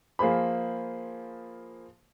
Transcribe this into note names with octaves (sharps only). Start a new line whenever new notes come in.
F3 A#3 G#4 C5 B5